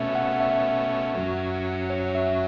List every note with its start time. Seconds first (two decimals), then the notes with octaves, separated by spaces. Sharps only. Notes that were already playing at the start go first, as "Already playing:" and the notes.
Already playing: B2 A3 C#4 E5
0.15 F#5
0.40 E5
1.14 F#2 F#3 C#4
1.90 C#5
2.15 E5